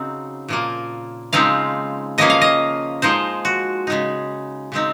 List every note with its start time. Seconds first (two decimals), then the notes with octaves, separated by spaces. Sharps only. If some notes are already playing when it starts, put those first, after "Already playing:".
Already playing: C#3 F#3 C4 D#4
0.48 A#2 F3 A#3
1.33 C#3 F3 G#3 C4 D#4 F5
2.18 C#3 F3 A#3 C#4 D#5
2.30 F5
2.41 D#5
3.02 F3 G#3 D#4 C5
3.45 F#4
3.87 C#3 G#3 D#4
4.72 C#3 G#3 C4 D#4